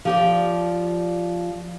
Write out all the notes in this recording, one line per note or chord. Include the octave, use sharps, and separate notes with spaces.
F3 G4 D5